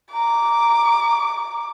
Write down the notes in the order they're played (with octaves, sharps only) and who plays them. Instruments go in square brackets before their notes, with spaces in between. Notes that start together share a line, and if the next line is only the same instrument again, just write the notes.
[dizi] A#5 [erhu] D6